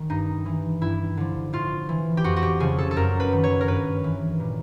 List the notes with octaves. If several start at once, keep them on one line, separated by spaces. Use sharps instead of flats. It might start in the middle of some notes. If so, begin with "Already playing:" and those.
Already playing: D#3
G2 D#4
E3
G2 E4
D3 F3
A2 F4
E3
G4
F2 F#4
F#4
G4
C#3 F3 G#4
A4
A4
F#2 A#4
B4
D#3
C#5
A#4
G2 B4
E3
A#2